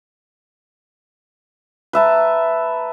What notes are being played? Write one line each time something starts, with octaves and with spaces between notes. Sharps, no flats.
B4 E5 A5 A#5